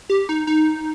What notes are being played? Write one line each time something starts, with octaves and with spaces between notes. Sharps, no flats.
G4
D#4
D#4